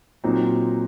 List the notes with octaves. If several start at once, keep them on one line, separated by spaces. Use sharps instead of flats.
A#2 F#3 C4 D#4